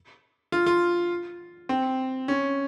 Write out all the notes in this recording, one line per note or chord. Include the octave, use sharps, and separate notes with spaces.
F4
F4
C4
C#4